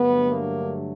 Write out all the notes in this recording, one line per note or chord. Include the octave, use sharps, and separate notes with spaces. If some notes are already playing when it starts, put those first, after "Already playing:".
Already playing: G2 D3 F#3 A3 B3
A#3